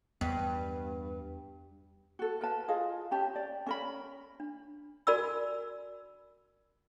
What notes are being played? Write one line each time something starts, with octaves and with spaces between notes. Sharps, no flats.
E2 G2 B3
F#4 A4
A#4 B4 A5
F4 G#4 D#5 F5
C#4 G4 A5
D5
C#4 A#4 B5
D4
F#4 A#4 D5 G#5 B5 E6